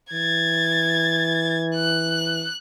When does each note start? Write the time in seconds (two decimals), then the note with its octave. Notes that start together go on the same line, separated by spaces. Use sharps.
0.12 E3 G#6 A6
1.74 F#6